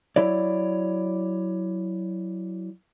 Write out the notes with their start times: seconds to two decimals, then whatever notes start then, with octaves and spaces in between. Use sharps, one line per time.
0.16 F#3 E4 C#5 D5